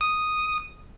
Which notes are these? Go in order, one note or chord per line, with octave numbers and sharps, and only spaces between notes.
D#6